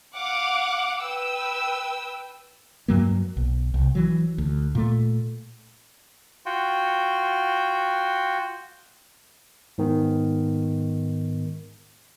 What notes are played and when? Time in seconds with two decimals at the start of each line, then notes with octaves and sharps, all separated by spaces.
0.17 F5 F#5 D6
1.02 B4 G5 E6
2.88 G2 F#3 A#3
3.37 B1
3.74 C2
3.95 E3 F#3
4.38 D2
4.75 A#2 A3
6.46 F4 F#4 G5
9.78 G#2 D#3 B3